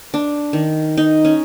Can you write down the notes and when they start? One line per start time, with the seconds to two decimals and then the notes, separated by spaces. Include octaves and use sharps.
0.14 D4
0.53 D#3
0.97 D#4
1.25 C#4